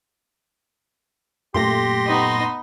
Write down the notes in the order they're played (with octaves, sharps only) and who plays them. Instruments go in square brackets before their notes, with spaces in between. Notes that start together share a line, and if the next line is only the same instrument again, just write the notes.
[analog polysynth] F#2 A#2 A3 [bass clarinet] G4 [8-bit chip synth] C6 A#6
[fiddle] B3 D#4